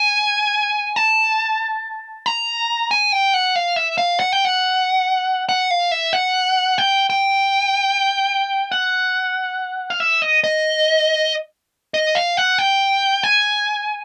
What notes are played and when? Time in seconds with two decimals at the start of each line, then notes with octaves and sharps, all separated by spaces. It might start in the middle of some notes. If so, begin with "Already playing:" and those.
Already playing: G#5
0.96 A5
2.26 A#5
2.91 G#5
3.12 G5
3.34 F#5
3.56 F5
3.76 E5
3.98 F5
4.20 F#5
4.32 G5
4.45 F#5
5.49 F#5
5.71 F5
5.91 E5
6.13 F#5
6.78 G5
7.10 G5
8.72 F#5
9.90 F5
10.00 E5
10.22 D#5
10.44 D#5
11.94 D#5
12.15 F5
12.37 F#5
12.58 G5
13.23 G#5